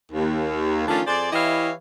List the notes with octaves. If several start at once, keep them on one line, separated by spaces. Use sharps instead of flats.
D#2
D#3 F3 A3 C#4 D4 F4
F2 G#4 C5 D5
E3 E4 G4 C#5 D#5 F5